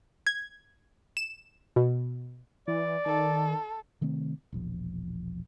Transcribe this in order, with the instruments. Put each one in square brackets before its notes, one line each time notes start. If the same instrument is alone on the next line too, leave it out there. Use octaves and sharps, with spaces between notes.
[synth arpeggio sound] G#6
E7
B2
[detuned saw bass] E3 [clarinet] D5
[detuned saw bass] D#3 [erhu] A4
[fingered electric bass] C3 D#3 A3 C4
E1 A#1 F3